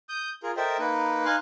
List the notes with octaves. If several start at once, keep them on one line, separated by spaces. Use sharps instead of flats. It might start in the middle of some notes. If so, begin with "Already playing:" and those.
D#6 G6
F4 G#4 A#4
A4 A#4 C5 D#5 E5 G5
A#3 D#4 B4
D#4 F5 G#5 C6 F#6